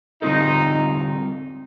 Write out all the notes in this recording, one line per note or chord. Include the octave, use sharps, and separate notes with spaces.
D3 G3 C4 D#4 F4 A4